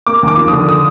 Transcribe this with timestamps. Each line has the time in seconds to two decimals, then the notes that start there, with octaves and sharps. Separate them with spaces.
0.07 A#3 D6
0.23 D#2
0.28 D6
0.37 F3
0.48 D3 D#6
0.69 D#6